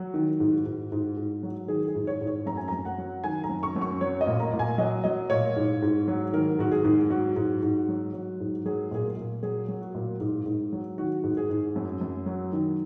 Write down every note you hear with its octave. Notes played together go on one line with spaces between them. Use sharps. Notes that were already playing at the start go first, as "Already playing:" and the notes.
Already playing: F#3 F#4
D#3
G#2
G#2
G#2
G#2
F#3
D#3 G#4
G#4
G#2
C#5
G#2
C#5
F#2 A#5
G#5
F#2 A#5
F#5
F#3
D#3 G#5
A#5
F#2
C#6
F#2
C#6
F#3 C#5
D#5
A#2
A#5
A#2
G#5
F#3 D#5
F#3 D#5
A#2 C#5
G#2
G#2
F#3
D#3 A#4
G#2 F#4
G#4
G#2
F#3 F#4
G#2
G#2
F#3
F#3
G#2
F#3 G#4
A#2 G#4
A#4
A#2
F#3 G#4
F#3
F#4
A#2
G#2
G#2
F#3
D#3 F#4
G#2
G#4
G#2
F#2
F#2
F#3
D#3